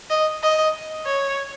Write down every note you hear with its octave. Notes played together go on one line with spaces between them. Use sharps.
D#5
D#5
C#5